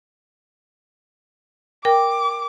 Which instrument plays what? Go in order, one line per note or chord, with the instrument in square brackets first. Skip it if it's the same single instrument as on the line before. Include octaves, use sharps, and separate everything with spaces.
[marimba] A#4 G5 [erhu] D6